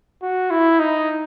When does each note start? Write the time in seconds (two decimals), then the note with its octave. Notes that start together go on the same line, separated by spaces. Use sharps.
0.22 F#4
0.51 E4
0.80 D#4